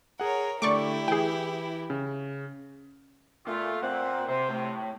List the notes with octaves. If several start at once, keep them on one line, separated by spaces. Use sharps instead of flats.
G#4 A#4 C#5 F#5
D3 A3 E4 G4 D5 C#6 D6
E3 G#4 G5
C#3
A#2 A3 F4
A#2 C4 F#5
C3 C5
A2